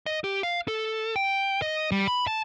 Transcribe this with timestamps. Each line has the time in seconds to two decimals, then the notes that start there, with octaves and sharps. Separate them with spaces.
0.06 D#5
0.24 G4
0.43 F5
0.68 A4
1.16 G5
1.62 D#5
1.92 G3
2.08 B5
2.27 A5